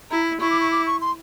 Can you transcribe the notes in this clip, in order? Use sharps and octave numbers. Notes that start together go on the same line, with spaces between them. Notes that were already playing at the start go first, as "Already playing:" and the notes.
E4 A#5
E4 C#6
D6
C#6
D6
C#6
C6